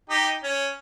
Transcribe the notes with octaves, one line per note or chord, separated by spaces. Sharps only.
D#4 G4
C#4